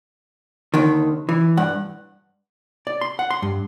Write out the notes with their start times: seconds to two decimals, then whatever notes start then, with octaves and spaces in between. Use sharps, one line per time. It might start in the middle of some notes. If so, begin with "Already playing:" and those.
0.74 D#2 D3 D#3
1.29 E3
1.57 G2 F#5
2.87 D5
3.01 C6
3.19 F#5
3.30 C6
3.42 G2